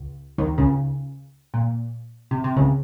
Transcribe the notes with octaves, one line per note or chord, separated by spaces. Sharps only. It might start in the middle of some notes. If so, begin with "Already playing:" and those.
Already playing: C#2
D#2 D#3
C#2 C#3
A#2
C3
C3
C#2 C#3